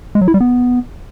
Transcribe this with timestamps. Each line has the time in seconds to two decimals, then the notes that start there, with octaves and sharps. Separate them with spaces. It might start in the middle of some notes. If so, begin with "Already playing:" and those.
0.15 G#3
0.21 F#3
0.28 E4
0.34 G3
0.40 B3